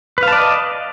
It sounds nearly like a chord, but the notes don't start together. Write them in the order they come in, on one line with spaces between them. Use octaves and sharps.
B4 F5 A5 D5 D#5